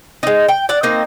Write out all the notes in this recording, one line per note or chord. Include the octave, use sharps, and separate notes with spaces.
G#3 D#4
G5
D5 F#5
A#3 C4 D#4